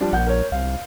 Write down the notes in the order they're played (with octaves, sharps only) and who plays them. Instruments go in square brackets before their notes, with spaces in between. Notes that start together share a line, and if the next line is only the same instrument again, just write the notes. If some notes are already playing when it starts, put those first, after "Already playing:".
[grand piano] F3 G3 D4
[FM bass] A#1 [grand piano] F#5 G6
[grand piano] A#4 C#5
[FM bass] C2 [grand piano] F5